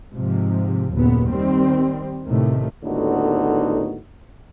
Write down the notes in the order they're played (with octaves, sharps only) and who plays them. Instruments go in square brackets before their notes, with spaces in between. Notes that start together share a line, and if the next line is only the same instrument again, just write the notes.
[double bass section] G#2 C3 F3
F#1 D#2 A#2 C#3 B3
D#3 G3 C4
A1 A2 C3 D#3 A3
[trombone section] D#2 A2 D3 B3 D#4 F#4